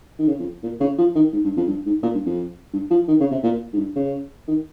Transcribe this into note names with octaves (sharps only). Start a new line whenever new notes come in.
D#3
C#3
F2
A#2
C#3
F3
D#3
G#2
G2
F2
G2
G#2
A#2
G2
F2
G2
F3
D#3
C#3
C3
A#2
G#2
G2
C#3
D#3